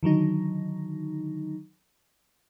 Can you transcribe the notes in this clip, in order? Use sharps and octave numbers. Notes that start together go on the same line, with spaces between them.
D3 D#3 F#3 D#4